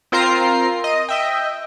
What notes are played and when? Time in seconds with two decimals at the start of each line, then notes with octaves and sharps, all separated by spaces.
0.12 C4 F4 A#4 C5 A#5 C7
0.84 D#5
1.09 D#5 E5 G5